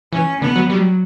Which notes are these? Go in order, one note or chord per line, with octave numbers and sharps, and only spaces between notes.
E3 C#4
D3 B3
F#3
F#3 G3